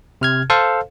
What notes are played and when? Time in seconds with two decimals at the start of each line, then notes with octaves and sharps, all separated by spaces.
0.21 C3 F6 G#6
0.50 A4 C5 F5